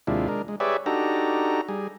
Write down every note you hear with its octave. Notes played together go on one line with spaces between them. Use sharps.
D#2 C3 G#3 D4 E4 F4
G#3 D4 A#4
G#3
G4 G#4 B4 C#5 D5 E5
D4 D#4 F#4 G4 A4 A#5
G3 G#4